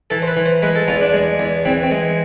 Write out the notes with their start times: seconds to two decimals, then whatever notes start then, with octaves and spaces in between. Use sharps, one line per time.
0.10 E3 A4
0.22 C5
0.28 B4
0.37 E3
0.46 C5
0.62 G#3 B4
0.75 A4
0.88 E2 F4
1.01 D4
1.14 G#3
1.39 E2
1.65 E3 C4
1.83 C4
1.91 G#3